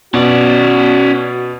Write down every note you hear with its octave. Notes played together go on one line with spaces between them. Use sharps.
B2 C#4 F#4 D5